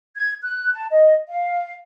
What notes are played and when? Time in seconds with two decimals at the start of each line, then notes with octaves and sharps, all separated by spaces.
0.17 G#6
0.43 F#6
0.73 A5
0.91 D#5
1.28 F5